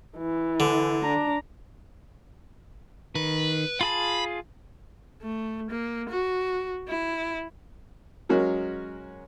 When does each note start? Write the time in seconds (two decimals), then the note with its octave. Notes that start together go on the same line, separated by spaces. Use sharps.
0.17 E3
0.60 D3
1.02 D4 A#5
3.15 D#3 B4
3.81 F4 G#4 A5 B5
5.22 A3
5.71 A#3
6.09 F#4
6.88 E4
8.29 F#3 G#3 C#4 F#4 A#4